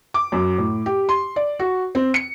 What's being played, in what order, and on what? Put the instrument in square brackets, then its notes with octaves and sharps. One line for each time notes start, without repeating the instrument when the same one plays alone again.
[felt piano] D6
F#2
A2
G4
C6
D5
F#4
C4
C#7